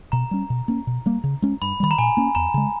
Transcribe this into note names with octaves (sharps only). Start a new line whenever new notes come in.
B2 A#5
G3 C#4
B2
A#3 C#4
B2
G3 A#3
C#3
G#3 C#4
G2 B5
D#3 G3 B5
A#5
A#2 G#5
A#3 C#4
E2 A#5
C#3 G#3